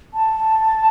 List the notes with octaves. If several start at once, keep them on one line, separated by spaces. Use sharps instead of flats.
A5